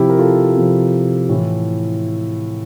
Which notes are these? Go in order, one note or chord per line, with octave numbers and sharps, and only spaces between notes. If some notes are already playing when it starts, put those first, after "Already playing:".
Already playing: C3 F3 E4 G4
A#4
F4 A4
C3 F3
A2 E3